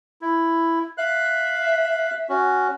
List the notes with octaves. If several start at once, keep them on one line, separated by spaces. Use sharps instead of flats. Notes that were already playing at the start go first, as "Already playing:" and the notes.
E4
E5 F5 F#6
C#4 F#4